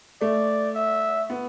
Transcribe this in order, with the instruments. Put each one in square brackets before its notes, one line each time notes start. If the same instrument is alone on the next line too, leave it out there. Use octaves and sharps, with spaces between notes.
[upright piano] A3 [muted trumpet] D5
[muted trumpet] E5
[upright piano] B3